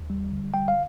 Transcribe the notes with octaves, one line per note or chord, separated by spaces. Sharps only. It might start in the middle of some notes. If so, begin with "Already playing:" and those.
Already playing: D#2
G3
D3
G3 G5
F5